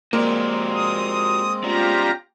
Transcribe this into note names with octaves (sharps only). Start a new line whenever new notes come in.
G#3 A#3 C4 F#4 G4 D5
D#6
B3 C#4 F4 G4 D5 A#5